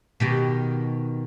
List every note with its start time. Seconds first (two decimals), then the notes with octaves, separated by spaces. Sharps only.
0.20 B2 D#3 G4